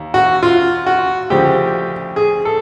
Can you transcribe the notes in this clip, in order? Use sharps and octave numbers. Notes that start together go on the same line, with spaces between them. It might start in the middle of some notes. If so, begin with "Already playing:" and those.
Already playing: D#2
F#4
F4
F#4
D2 C#3 F3 G4
G#4
A4